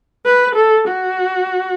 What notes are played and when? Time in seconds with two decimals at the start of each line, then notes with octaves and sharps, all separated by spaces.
0.25 B4
0.56 A4
0.88 F#4